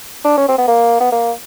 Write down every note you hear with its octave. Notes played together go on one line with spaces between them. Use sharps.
D4
C#4
C4
B3
A#3
B3
A#3